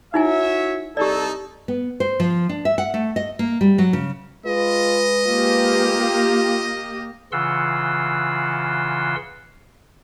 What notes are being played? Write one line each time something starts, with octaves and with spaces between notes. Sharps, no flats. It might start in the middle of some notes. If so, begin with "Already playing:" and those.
D#4 E4 F#4 C#5 E5 G#5
C2 D#4 G4 A4 D5
B3
C5
F3
D4
E5
F#5
A3
D#5
A#3
G3
F#3
C#3
G#3 F4 B4 D#5
A#3 F4 G4
C#3 E3 F4 F#5 C6 E6